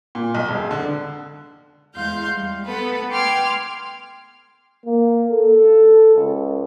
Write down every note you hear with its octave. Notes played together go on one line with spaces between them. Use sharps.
A#2
B1
E1
D3
E2 G#3 F5 C6 G6
G3
B3 A4 B4
G5 C6 D6 F6 G#6
A#3
A4
C#2